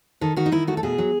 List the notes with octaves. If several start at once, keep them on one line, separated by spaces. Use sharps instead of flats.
D#3 A4
D#3 F#4
D#4
D#3 E4
A3 F#4
A4
B2 G#4
F#3